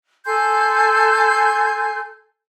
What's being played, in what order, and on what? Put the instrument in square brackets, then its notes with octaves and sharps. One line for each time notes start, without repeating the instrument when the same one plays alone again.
[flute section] A4 G#5 C6 G6